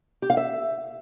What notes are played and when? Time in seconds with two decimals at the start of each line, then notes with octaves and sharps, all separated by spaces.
0.22 G4
0.30 F5
0.37 E5